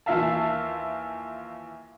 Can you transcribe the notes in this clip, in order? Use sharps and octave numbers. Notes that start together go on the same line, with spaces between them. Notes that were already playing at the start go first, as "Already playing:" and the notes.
D#2 E3 F4 E5 F5 A5